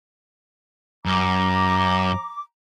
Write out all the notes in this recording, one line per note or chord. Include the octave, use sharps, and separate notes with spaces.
F#2 A#5 D6